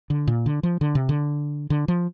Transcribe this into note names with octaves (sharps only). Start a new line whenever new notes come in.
D3
A#2
D3
F3
D3
C3
D3
D3
F3